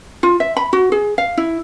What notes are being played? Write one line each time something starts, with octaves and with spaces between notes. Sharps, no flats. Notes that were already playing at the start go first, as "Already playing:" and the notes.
F4
E5
B5
F#4
G#4
F5
E4